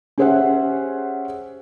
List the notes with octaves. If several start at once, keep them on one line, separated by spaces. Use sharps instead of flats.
C#4 G4 G#4 C5 E5 F#5